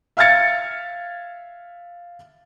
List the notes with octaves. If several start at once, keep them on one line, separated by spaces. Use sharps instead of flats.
E5 F5 F6 G#6 A6 C#7